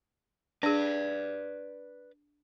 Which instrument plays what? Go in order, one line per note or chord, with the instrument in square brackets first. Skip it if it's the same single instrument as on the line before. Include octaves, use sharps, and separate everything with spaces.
[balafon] D4 G#4 [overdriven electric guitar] B4 D5